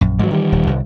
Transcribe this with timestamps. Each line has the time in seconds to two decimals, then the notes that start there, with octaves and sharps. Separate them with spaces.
0.01 A#1 F#2
0.19 G#2 E3 F#3
0.31 D#3 G3
0.52 D#1
0.67 C2